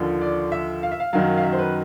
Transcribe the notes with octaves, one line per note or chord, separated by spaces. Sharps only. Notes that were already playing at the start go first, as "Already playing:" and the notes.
Already playing: D#2 D3 F3
D5
E5
F5
E5
F5
F#2 D#3 F#3 F5
F5
E5
C5
B4